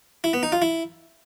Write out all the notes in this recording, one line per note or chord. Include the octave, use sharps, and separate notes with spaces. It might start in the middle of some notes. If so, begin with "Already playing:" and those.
E4
B3
D#4
F4
E4